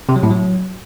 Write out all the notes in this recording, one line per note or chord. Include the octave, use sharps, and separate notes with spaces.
C3
F#3
A2
F#3